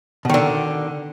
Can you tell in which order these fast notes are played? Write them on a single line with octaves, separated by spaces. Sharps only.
B2 D#3 D3